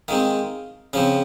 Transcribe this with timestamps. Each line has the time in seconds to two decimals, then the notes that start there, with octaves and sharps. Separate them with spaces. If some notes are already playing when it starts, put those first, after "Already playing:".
0.08 D#3 G#3 C4 F5
0.93 C#3 F3 C4 F5